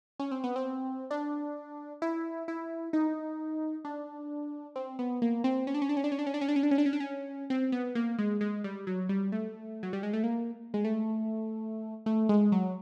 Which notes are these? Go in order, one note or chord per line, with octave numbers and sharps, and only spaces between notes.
C#4
C4
B3
C4
D4
E4
E4
D#4
D4
C4
B3
A#3
C4
C#4
D4
C#4
D4
C#4
D4
C#4
D4
C#4
D4
C#4
D4
C#4
D4
C#4
D4
C#4
D4
C#4
C4
B3
A#3
G#3
G#3
G3
F#3
G3
A3
F#3
G3
G#3
A3
A#3
G#3
A3
A3
G#3
F#3